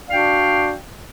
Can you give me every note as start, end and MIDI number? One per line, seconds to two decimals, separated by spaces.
0.09 0.73 62
0.09 0.73 66
0.09 0.73 74
0.09 0.73 77
0.09 0.73 79